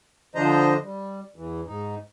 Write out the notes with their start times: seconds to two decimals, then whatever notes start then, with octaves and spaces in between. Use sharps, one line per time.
0.35 D3 F3 D4 C5 D#5 A#5
0.83 G3
1.36 E2 E3
1.67 G#2 D#4